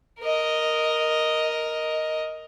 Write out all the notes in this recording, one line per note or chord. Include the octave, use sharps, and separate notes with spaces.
A#4 D#5